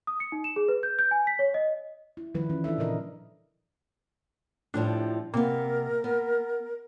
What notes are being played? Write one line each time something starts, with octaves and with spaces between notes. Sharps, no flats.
D#6
C#7
D#4
E7
G#4
B4
G6
G6
G#5
B6
C#5
D#5
E4
D#3 F3 G3 E4 B4
E3 C#4
D4 E4 A4 E5
A#2 C#3 D#4 A#4 D#5
A2 F3 G3 D4
C3 A#3 B3 A#4
B3